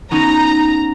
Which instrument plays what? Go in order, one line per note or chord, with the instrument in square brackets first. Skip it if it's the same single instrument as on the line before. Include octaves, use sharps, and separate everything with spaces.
[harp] B3 C#4 D#4 [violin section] A#5